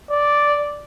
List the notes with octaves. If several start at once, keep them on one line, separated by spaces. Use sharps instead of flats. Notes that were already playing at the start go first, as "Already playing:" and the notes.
D5